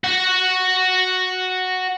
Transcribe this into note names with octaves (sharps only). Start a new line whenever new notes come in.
F#4 F#5